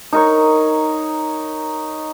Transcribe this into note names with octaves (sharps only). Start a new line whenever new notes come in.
D#4 A#4 C#5